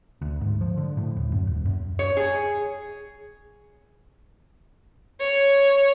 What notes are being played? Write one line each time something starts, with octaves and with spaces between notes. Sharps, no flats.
D2
G#2
F3
D3
A2
D#1
F#2
D#1
F#2
C#5
G#4
C#5